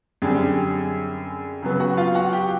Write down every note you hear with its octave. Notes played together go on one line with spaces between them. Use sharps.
F#2 D3 G3 C4 G#4 G#5
C#3 F#3 B3
F#4 F#5
F4 F5
F#4 F#5
G4 G5